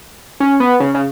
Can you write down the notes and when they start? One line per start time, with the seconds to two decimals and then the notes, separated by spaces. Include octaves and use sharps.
0.40 C#4
0.60 B3
0.80 C#3
0.95 C#3